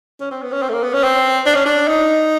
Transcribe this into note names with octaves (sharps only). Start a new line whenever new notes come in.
C#4
C4
B3
C#4
C4
A3
A#3
B3
C#4
C4
D4
C#4
D4
D#4